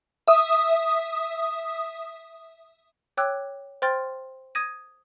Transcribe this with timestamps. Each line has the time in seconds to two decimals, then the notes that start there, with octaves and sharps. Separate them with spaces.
0.28 E5 D#6
3.17 C#5 G5 D6 E6 F#6 G#6
3.82 C5 G5 C6 F6 A6
4.55 D#6 G#6 A#6 D#7